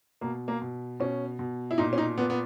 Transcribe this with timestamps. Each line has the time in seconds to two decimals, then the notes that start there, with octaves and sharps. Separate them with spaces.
0.21 B2 A#3
0.48 A#3
0.62 B2
1.00 B2 C#4
1.39 B2
1.71 E4
1.78 A#2 D#4
1.93 C#4
1.98 D#4
2.18 A#2 B3
2.30 B3